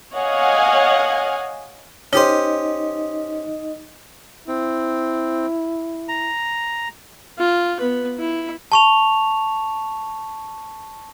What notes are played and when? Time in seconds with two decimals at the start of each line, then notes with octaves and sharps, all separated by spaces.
0.14 C#5 D#5 F5 F#5 G#5
2.13 C#4 D#4 G4 C5 D#5
4.48 C4 E4
6.09 A#5
7.38 F4
7.80 B3 B4
8.19 E4
8.72 A5 C#6 F7